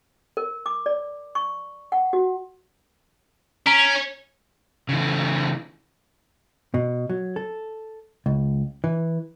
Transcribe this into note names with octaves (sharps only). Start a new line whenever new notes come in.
A#4
D6
D5
C#6
F#5
F#4
C#4 A#5 B6 D7
C#3 E3
B2
F#3
A4
C#2
E3